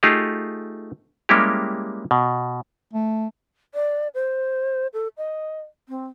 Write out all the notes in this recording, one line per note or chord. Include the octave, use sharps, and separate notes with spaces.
A3 D#4 F4 G4 G#4 F5
G3 G#3 A#3 C#4 E4 G4
B2
A3
D5
C5
A4
D#5
C4